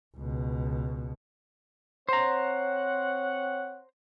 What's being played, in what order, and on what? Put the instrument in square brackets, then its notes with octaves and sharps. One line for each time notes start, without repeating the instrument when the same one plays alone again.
[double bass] C#2 B2
[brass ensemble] C4 C#5 F#5 [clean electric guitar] C5 A#5